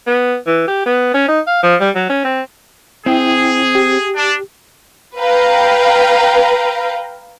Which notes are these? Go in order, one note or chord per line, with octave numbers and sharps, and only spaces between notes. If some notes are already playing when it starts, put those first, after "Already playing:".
B3
E3
G4
B3
C#4
D#4
F5
F3
G3
F#3
C#4
C4
C4 E4 G#4 G5
G4
D4
B4 F5 G5 A#5